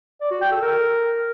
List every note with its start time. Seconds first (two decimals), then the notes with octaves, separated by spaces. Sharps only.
0.21 D5
0.31 F#4
0.41 G5
0.52 A4
0.62 A#4